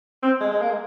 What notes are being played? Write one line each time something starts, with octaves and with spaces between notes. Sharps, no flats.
C4
G#3
G#3
A#3
G#3